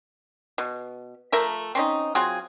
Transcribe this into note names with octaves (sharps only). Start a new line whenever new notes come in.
B2
F3 A3 A#4 E5
C4 C#4 D#4
F#3 C4 F4 G#4